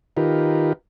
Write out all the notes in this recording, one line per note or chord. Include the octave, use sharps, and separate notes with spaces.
D#3 D#4 F4 G4 A#4 B4